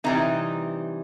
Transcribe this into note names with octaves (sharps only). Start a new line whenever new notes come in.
C3 E3 G3 D#4